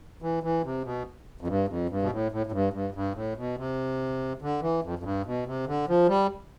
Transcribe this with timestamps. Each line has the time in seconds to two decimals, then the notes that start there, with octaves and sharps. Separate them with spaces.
0.22 E3
0.43 E3
0.64 C3
0.84 B2
1.41 F2
1.47 G2
1.68 F2
1.89 G2
2.02 B2
2.11 A2
2.32 A2
2.47 A2
2.52 G2
2.73 G2
2.94 G2
3.15 A2
3.37 B2
3.57 C3
4.42 D3
4.62 E3
4.83 F2
4.99 F2
5.03 G2
5.26 B2
5.46 C3
5.67 D3
5.88 F3
6.08 G3